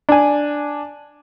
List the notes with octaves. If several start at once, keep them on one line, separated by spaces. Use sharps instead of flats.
D4 G#5